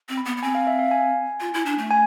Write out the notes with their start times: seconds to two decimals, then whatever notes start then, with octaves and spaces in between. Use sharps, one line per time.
0.09 C4
0.17 B5
0.25 B3
0.37 B3
0.43 C4 G#5
0.55 F5
0.67 E5
0.79 F5
0.91 G#5
1.40 F4
1.54 E4
1.66 D4
1.78 A3
1.91 G#5